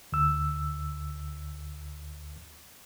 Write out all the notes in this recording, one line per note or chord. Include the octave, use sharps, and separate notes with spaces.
D2 E6